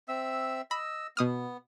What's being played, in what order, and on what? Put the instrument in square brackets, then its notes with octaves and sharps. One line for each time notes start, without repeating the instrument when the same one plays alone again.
[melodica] C4 E5 E6
[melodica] D#5 E6 [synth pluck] B5
[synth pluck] B2 D#6 F6 [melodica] B3